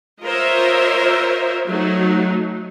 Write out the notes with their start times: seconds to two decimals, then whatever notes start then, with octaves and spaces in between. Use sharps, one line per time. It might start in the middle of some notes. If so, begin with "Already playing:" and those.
0.23 F4 A#4 C5 C#5 D#5 E5
1.67 F#3 A3 D#4